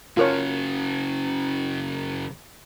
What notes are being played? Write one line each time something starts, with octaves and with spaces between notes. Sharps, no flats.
C#3 F#3 F4 A#4 C#5